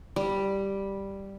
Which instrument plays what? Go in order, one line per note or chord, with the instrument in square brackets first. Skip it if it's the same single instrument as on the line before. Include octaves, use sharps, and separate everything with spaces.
[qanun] G3